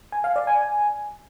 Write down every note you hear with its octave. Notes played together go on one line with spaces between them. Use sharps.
G#5
F5
D5
G#5